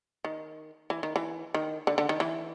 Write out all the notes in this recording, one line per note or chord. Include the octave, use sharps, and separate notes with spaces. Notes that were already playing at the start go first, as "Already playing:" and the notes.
D#3
E3
D#3
E3
D#3
D3
D3
D#3
E3